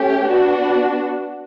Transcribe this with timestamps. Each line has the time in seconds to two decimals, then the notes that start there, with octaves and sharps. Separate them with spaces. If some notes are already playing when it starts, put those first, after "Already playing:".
Already playing: A3 C#4 G4
0.26 B3 D4 F#4